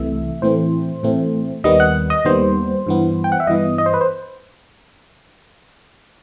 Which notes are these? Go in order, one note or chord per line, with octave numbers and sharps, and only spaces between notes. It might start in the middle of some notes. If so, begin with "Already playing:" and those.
Already playing: C2 C3 E3 A3 E5
A2 E3 A3 C4 C5
A2 E3 A3 C4
D#2 D#3 G3 B3 D#5
F#5
D#5
D#2 D#3 G3 B3 C5
G2 E3 B3
G5
F#5
E5
G2 E3 B3 D#5
D#5
C5
B4
C5